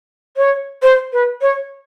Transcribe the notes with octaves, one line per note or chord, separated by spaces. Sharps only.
C#5
C5
B4
C#5